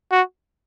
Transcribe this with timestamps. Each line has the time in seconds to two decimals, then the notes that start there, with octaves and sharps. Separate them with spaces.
0.11 F#4